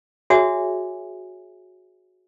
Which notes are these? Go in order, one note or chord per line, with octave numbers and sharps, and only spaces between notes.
F#4 G#4 C#5 E5 G#5 D#6